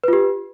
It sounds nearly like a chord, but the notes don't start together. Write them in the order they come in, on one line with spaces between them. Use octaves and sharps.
B4 F4 G4